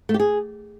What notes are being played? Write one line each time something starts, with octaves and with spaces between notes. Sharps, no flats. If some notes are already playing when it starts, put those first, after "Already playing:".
A3
G4
G#4